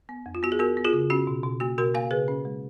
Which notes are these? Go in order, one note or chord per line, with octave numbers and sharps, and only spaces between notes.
B3
F2
F4
B3 F#4
G#4
B3 F#4 A#4
B3
F4 G#4
C#3
C#4 F#4
B2
B2
A#3 F#4
B2 F#4 A#4
A#3 F5 G#5
C#3 G#4 B4
C#4
G#3